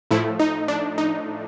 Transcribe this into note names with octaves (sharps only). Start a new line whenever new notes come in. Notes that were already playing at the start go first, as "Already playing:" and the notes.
A2 F3 A3 E4
D#4
D4
D#4